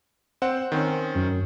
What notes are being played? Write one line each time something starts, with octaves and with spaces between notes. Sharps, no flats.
C4 C5 F#5
D#3 C4 C#4
F#2